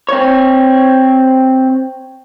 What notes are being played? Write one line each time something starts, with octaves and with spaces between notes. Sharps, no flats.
C4 C#5